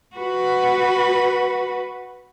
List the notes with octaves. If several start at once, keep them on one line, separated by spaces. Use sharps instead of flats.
F#4 B4